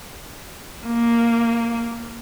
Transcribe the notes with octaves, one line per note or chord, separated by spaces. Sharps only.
A#3